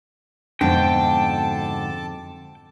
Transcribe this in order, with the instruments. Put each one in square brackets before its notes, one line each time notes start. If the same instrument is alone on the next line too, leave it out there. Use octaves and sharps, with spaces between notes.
[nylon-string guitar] F2 [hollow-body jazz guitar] G#2 B2 D3 [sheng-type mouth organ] A4 A5 D6 [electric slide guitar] G5